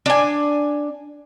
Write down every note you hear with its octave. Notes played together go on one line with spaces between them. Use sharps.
D4 G#5